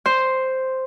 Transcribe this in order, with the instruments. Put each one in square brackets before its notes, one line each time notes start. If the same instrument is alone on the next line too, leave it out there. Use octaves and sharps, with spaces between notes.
[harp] C5